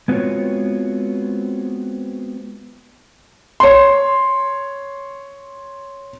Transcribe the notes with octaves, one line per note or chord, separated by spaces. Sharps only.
G#3 B3 C4 F4 F#4 C#5
C#5 C6